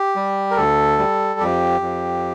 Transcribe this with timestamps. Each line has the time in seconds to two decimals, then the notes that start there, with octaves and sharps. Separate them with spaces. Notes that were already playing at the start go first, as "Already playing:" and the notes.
Already playing: G4
0.16 G3
0.51 A#4
0.57 D2 A4
0.99 G3
1.40 F2 G4
1.81 F2